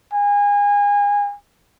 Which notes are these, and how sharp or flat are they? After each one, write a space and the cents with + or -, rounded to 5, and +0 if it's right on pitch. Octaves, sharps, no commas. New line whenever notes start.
G#5 -30